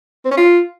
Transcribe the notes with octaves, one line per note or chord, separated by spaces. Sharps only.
C4
C#4
F4